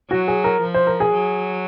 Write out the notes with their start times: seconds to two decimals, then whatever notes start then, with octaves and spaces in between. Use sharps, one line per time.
0.10 F#3 F#4
0.28 G#4
0.44 A#4
0.62 F3
0.74 C5
0.87 A#4
1.00 G#4
1.13 F#3